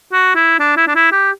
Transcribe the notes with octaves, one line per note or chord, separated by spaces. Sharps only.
F#4
E4
D4
E4
D4
E4
G4